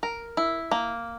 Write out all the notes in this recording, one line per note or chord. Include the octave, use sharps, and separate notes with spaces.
A#4
E4
A#3